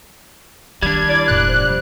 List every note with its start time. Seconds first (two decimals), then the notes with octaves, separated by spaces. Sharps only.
0.82 D#3 G3 D4 G#6
1.09 E4 A#4 D5
1.28 E1 A2 F#6
1.48 F3 C5